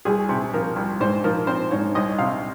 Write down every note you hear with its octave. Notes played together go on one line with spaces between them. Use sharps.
C2 G#4
C3
F3 A#4
C2
G#2 C5
F3 A#4
C4 C5
G#2 C#5
C2 D#5
C3 F5